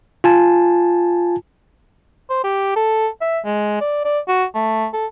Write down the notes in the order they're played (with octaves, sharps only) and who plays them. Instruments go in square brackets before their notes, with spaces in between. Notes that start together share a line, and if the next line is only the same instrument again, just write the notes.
[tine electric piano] F4 G#5 A5
[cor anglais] C5
G4
A4
E5
G#3
D5
D5
F#4
A3
A4